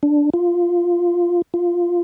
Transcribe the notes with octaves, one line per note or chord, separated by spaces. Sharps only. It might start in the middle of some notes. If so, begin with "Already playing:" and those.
D4
F4
F4